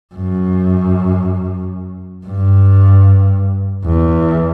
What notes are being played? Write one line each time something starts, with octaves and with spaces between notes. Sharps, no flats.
F#2
G2
E2